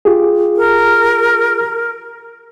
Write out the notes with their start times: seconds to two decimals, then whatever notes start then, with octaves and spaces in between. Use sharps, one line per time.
0.05 F4 G4 G#4
0.57 A#4